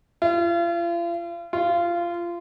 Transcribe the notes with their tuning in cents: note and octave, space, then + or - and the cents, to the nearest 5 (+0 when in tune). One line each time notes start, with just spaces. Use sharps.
F4 -40
F4 -20